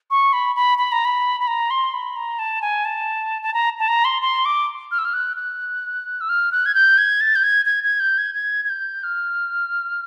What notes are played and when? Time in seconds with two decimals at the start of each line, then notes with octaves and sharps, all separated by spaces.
0.11 C#6
0.33 B5
0.56 B5
0.78 B5
0.92 A#5
1.05 B5
1.40 B5
1.47 A#5
1.70 C6
1.94 B5
2.16 A#5
2.39 A5
2.62 G#5
2.85 A5
3.42 A5
3.54 A#5
3.79 A5
3.88 A#5
4.05 C6
4.22 C6
4.45 D6
4.91 F6
4.99 E6
5.05 F6
5.14 F#6
5.37 F#6
6.21 E6
6.29 F6
6.52 F#6
6.66 G#6
6.75 G6
6.98 G#6
7.21 A6
7.35 G6
7.43 G#6
7.66 G#6
7.84 G#6
8.00 G6
8.18 G#6
8.35 G#6
8.65 G#6
8.70 G6
9.04 F6